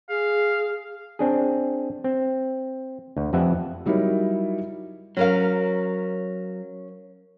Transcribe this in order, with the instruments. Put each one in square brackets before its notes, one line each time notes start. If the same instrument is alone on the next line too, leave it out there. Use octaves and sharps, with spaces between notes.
[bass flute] G#4 [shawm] F5
[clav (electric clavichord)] C4 D4 G#4
C4
D2
F2 G4 B4 E5 F#5
[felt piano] F#3 G3 D#4 E4 A#4 C#5
[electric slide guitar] F#3 [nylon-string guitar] C#4 A#4 F5